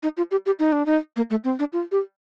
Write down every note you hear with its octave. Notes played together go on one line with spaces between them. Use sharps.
D#4
F4
G4
G4
D#4
D4
D#4
A#3
A3
C4
D4
F4
G4